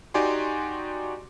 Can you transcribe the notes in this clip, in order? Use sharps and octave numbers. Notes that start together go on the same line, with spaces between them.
D#4 F#4 G4 D5 G#5 C6